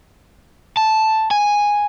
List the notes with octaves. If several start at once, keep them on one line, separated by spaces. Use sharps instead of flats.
A5
G#5